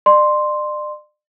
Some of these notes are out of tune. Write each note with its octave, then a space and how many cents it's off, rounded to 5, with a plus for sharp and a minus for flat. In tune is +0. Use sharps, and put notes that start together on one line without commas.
D5 +40 C6 +0